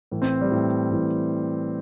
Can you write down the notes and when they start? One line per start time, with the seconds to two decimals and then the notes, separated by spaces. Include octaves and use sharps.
0.11 A2 E3
0.22 C4
0.41 G3
0.51 A2 E3
0.91 A2 E3